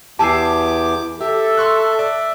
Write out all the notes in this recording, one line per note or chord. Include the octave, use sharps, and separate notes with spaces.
E2 G4 G#5 A5 D6 E6 C7 E7
G4 A4 E5
C6 C#6 F#6
D5